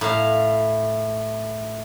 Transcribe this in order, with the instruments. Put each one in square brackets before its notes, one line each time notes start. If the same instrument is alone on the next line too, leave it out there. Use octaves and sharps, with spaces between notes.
[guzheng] A2 F5